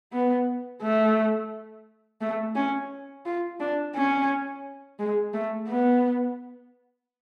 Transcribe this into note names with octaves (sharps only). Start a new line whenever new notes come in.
B3
A3
A3
C#4
F4
D4
C#4
G#3
A3
B3